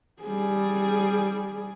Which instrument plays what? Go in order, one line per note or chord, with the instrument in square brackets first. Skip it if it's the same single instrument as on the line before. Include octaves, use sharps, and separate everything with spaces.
[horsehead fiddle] G3 G#4